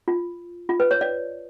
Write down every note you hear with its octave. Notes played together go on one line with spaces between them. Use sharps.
F4
F4
B4
C#5
D5